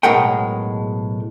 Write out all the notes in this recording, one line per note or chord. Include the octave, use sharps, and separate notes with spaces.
B1 A2 G#3 A#4 F#5 G5